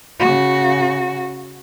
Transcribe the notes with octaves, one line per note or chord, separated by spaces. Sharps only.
C#3 F#4